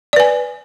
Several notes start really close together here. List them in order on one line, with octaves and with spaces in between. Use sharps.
D5 B4 G#5